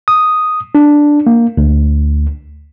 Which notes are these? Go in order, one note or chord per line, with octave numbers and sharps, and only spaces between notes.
D#6
D4
A#3
D2